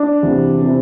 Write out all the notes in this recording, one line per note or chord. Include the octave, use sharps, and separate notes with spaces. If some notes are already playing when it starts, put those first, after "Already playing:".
Already playing: D4
E2 C3 E3
C3 E3